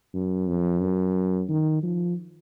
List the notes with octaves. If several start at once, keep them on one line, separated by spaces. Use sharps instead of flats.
F#2
F2
F#2
D#3
F3